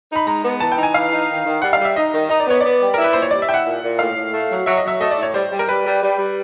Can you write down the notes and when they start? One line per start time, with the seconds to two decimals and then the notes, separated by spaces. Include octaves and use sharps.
0.11 D#4 B5
0.27 G#3 A#5
0.44 B3
0.60 E3 A5
0.72 G5
0.78 D#4 G#5
0.94 E3 F5
1.12 D#4
1.29 D#3
1.45 D#3
1.62 G3 F#5
1.73 F5
1.79 G3
1.85 E5
1.96 D#4 D#5
2.13 D#3
2.29 D#4 D#5
2.40 D5
2.47 B3 C#5
2.61 B3 D5
2.81 G3
2.94 E4 A#4
3.04 B4
3.13 A#2 C5
3.22 C#5
3.31 G3 D5
3.42 E5
3.48 E4 G5
3.54 F#5
3.65 A#2
3.83 A#2
3.99 A2 F5
4.16 A2
4.33 A3
4.50 F#3
4.66 F#3 E5
4.77 D#5
4.84 F#3 E5
5.01 A3 D#5
5.11 D5
5.18 A2 C#5
5.34 G3 C5
5.51 G3
5.59 A#4
5.68 G3 B4
5.85 G3
6.02 G3
6.19 G3